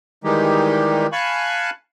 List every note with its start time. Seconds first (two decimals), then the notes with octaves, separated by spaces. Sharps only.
0.24 D#3 E3 G3 G#3 D#4 G4
1.12 F5 G#5 A5 B5 C#6 F#6